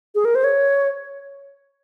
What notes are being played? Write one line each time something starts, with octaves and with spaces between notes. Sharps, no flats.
G#4
A#4
C5
C#5